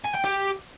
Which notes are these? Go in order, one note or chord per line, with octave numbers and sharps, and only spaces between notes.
G#5
G5
G4